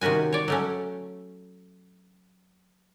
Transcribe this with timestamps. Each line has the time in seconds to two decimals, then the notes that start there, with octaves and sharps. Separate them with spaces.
0.01 C3 D#3 C#4 F#4 G#5
0.33 C#5 D5
0.48 F#3 A3 C#4